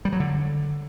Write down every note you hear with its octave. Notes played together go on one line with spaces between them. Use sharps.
G3
F#3
D3